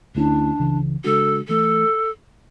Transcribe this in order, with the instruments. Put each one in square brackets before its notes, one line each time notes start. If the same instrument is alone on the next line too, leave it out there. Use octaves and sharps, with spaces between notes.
[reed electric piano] D2 D3 A3 C#4 E4 [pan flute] D4
[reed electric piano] C#2 C#3 E3
[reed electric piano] C#3 G#3 D4 F#4 [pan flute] A4
[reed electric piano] E3 A3 [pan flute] A4